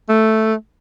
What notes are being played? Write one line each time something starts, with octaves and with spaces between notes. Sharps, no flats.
A3